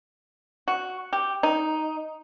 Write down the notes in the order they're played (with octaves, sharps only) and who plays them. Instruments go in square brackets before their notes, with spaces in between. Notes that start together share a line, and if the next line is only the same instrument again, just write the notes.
[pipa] F#4
G4
D#4